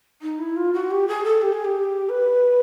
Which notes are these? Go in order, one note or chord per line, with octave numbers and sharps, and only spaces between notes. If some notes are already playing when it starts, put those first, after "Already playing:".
D#4
E4
F4
F#4
G4
G#4
A4
G4
G#4
G4
B4